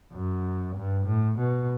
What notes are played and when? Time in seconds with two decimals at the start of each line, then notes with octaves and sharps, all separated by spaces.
0.13 F#2
0.76 G2
1.06 A2
1.38 B2